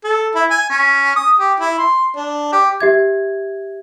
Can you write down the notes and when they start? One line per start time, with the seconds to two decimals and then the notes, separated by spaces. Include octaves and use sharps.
0.04 A4
0.35 E4
0.51 G#5
0.70 C#4
1.16 D#6
1.39 G4
1.60 E4
1.78 C6
2.16 D4
2.52 G4
2.80 G4 E5 G#6